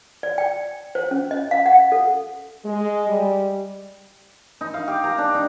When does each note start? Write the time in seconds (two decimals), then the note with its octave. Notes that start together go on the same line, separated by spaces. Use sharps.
0.23 D5
0.38 G5
0.95 C5
1.11 C#4
1.31 D#5
1.51 F5
1.66 F#5
1.92 A4
2.64 G#3
3.08 G3
4.61 D#4
4.74 F5
4.88 G4
5.04 A#5
5.18 D4
5.34 D#4